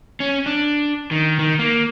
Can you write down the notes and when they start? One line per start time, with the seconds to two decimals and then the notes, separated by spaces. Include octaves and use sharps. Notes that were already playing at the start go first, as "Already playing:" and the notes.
0.20 C#4
0.46 D4
1.11 D#3
1.39 D#3
1.59 A#3